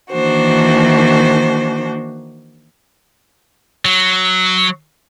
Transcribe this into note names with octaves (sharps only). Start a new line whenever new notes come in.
D#3 E3 A#3 D4 F#4 C5
F#3